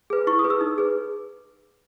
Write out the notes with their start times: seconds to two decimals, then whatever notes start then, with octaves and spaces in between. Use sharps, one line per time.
0.10 G#4 B4
0.27 E4 C#6
0.39 D#6
0.44 G#4 B4
0.50 E6
0.61 D#4
0.78 G#4 B4